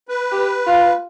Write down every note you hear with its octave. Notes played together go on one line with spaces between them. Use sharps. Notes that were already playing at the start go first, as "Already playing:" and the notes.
B4
G4
F4